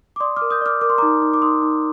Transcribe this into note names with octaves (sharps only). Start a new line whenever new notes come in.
D6
D5 C6 D#6
D6 F6
A#4
D#6 G6
D5 D6 F6
A#4 D6
C6
D#4 A#5 D6
D#4
D6
D#4 C6 D#6
D#4